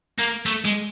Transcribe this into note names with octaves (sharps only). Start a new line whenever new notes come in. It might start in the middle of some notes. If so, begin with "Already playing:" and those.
A#3
A3
G#3